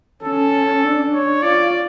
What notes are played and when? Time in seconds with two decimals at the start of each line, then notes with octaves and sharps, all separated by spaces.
0.23 C#4 A4
0.84 D4
1.14 C#5
1.43 F4 D5